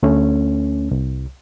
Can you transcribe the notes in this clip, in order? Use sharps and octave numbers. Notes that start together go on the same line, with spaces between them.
D2 A3 C#4
C2